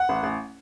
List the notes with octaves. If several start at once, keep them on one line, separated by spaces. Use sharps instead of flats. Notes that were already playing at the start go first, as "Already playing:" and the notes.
Already playing: F#5
A1
A1